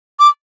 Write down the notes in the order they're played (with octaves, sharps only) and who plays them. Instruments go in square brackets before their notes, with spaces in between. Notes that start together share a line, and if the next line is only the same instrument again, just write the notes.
[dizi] D6